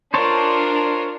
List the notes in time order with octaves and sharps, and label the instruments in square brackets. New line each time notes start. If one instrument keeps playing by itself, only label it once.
[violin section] D4 [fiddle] F4 A#4 [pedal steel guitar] C5 C#5 A5